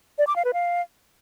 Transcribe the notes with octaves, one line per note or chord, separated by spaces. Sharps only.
D5
D6
F5
B4
F5